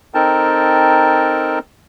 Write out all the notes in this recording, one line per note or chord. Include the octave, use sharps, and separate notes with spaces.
C4 D#4 A4 A#4 G5 A5